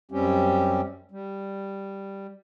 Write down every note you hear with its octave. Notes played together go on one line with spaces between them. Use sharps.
F#2 G3 C4 C#4 G4
G3